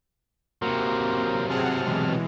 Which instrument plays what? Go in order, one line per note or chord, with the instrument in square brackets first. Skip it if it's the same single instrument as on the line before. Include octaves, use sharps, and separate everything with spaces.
[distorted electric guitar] C3 F#3 [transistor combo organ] A#3 A#4 C5
[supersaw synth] C4 G#4 F#5 [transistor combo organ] A5 F6
[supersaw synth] B2 E3 G#3